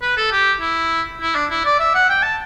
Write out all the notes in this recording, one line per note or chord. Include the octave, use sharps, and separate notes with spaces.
B4
A4
G4
E4
E4
D4
E4
D5
E5
F#5
G5
A5